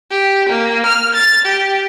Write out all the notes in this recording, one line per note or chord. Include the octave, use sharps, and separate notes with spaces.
G4
A#3
F6
A6
G4